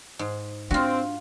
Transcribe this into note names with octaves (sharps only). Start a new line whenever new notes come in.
G#2
C4 D4 F4 F#4